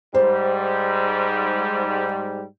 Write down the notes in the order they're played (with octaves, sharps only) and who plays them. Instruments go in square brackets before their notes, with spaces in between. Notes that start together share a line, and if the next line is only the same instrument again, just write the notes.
[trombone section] G#2 G3 [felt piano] C5